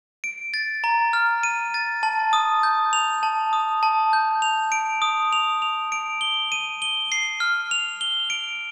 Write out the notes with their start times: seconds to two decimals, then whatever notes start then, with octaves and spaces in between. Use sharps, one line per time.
0.24 D7
0.54 A6
0.84 A#5
1.13 F6
1.43 D#7
1.74 A6
2.03 A5
2.33 D#6
2.63 G6
2.93 F7
3.23 A5
3.53 D#6
3.83 A5
4.13 G6
4.42 F7
4.72 D7
5.02 D#6
5.33 F7
5.62 F7
5.92 D7
6.21 G7
6.52 D#7
6.82 G7
7.12 C7
7.40 F6
7.71 F7
8.01 G7
8.30 D7